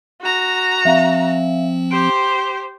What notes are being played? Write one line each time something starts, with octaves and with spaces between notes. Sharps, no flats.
F#4 A#5
F3 C4 E5 F5
G4 C5 D7